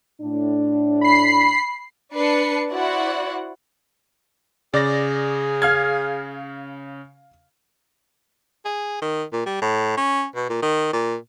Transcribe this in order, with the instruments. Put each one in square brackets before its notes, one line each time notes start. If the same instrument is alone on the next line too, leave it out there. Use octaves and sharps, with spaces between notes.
[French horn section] A2 D4
[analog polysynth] B5 C7
[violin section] D4 B4 A5 C7 C#7
E4 F#4 C5 D5 F#5
[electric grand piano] C#3 A#6 [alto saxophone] G#4 [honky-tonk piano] D5
[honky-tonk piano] F5 F6 G#6
[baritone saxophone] G#4
D#3
A#2
G3
A2
C#4
B2
A#2
D#3
A#2